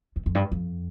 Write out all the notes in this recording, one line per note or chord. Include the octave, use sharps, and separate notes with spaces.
E2
F2
G2
F2